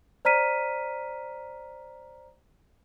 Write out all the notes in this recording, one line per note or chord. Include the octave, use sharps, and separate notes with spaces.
C5 D5 A#5 F6 B6 D#7